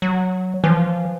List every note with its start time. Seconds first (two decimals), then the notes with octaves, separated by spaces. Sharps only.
0.02 F#3
0.64 E3 F3